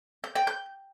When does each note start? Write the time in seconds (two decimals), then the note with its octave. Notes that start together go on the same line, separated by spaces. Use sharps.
0.24 G6
0.36 G5
0.47 G6